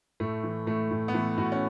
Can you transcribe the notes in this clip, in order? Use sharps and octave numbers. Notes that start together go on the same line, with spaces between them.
A2 A3
E3
A2 A3
A2
B3
E3 A3
A2 F#4
C#4